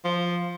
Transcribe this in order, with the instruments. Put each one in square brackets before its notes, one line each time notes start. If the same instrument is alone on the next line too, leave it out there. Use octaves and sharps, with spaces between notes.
[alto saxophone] F3